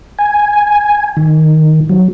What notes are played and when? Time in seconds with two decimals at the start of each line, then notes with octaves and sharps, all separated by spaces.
0.19 G#5
1.17 D#3
1.89 F#3